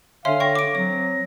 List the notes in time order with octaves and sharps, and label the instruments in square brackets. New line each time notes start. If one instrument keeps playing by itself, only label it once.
[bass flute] D3 [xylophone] C#5 E5 C6 [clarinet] F5 [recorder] G#5
[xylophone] C#5 G5 C#6 [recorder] A#6
[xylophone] D6 D7
[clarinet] F#3 [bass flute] C4 [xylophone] C#5